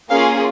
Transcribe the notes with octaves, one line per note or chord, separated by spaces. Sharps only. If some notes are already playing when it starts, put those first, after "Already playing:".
A#3 C#4 F4 G#4 F5